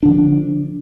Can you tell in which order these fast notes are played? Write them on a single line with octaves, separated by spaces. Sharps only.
D4 D3 F3